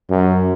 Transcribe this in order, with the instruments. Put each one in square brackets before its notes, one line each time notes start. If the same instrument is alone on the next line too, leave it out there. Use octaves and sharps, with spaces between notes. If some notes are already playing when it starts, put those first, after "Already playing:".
[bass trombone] F#2